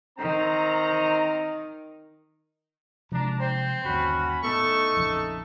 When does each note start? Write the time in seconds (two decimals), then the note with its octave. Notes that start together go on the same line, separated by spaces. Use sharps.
0.18 D#3 C4 A#5
3.12 C3 F3 G#3 D4 A#5
3.40 C4 C5
3.84 G1 D#2 C#4 F#4 B5
4.43 A2 A3 B3 D#4 A4 C#6
4.97 A#1 F2 C#3